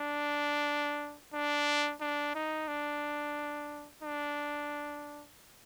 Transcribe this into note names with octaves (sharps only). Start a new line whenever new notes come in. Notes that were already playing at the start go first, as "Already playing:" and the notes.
Already playing: D4
D4
D4
D#4
D4
D4